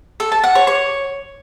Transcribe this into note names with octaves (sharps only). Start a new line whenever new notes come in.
A4
A5
F#5
C#5
C#5